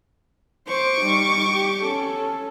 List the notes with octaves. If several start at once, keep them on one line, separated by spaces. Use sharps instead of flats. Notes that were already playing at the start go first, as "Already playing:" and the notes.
C5 C#6 D6
G3 D#4
G4
C#4 A4